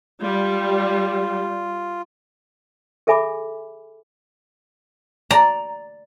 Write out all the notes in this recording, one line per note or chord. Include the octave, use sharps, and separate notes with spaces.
G3 F4
G#4 A4 E5 G#5 B5 D6
D5 A#5